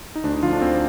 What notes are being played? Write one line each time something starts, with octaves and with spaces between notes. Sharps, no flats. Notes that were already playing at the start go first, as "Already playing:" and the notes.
D#4
D2 D4
D#4
D3 F3 F4
D4
D2 C4